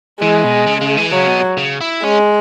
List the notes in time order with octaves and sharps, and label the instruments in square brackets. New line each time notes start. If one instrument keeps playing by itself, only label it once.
[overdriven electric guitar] E3 [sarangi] G#3
[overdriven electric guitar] B2
C#3
C#3
E3
[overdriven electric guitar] C#3 [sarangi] F#3
[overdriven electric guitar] B2
C#3
E4
[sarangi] G#3 [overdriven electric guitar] C#4